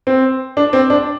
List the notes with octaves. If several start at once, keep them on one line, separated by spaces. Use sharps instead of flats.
C4
D4
C4
D4